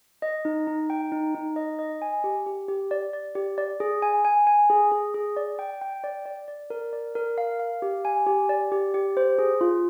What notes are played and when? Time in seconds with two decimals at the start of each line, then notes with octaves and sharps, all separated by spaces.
0.22 D#5
0.45 D#4
0.67 D#4
0.90 G5
1.12 D#4
1.35 D#4
1.56 D#5
1.79 D#5
2.02 G#5
2.24 G4
2.46 G4
2.68 G4
2.91 D5
3.13 D5
3.35 G4
3.58 D5
3.80 G#4
4.02 G#5
4.25 G#5
4.47 G#5
4.70 G#4
4.92 G#4
5.14 G#4
5.37 D5
5.59 G5
5.81 G5
6.04 D5
6.26 D5
6.48 D5
6.70 A#4
6.93 D5
7.15 A#4
7.38 F5
7.59 F5
7.82 G4
8.05 G#5
8.26 G4
8.49 D5
8.72 G4
8.94 G4
9.17 C5
9.39 G#4
9.61 F4